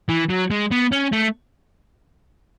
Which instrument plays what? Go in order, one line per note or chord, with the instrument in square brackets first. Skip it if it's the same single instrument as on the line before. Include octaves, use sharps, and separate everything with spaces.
[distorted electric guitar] E3
F#3
G#3
B3
C#4
A3